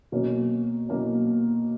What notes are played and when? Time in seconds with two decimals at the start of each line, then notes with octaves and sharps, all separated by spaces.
0.12 B2 F#3 A#3 C#4
0.89 B2 F#3 A#3 C#4